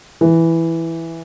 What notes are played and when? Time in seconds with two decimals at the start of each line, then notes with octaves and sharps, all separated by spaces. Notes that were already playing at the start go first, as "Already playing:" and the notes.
0.21 E3